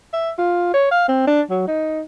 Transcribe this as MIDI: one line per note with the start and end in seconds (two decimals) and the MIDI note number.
0.13 0.31 76
0.38 0.70 65
0.74 0.88 73
0.91 1.07 77
1.08 1.24 60
1.27 1.41 62
1.50 1.63 54
1.67 2.01 63